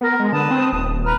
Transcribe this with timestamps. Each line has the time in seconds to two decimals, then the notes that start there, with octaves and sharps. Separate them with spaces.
0.01 B3 A#4
0.20 G#3
0.32 D3 B4 A5 D#6
0.51 C4
0.73 D#1
1.04 B4 A#5 F6